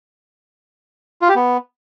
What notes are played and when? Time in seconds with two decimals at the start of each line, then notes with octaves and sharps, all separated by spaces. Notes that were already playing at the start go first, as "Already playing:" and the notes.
1.22 F4
1.29 G4
1.35 B3